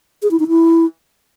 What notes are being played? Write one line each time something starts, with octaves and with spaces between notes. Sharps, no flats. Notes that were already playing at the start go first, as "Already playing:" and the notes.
G#4
E4
D#4
E4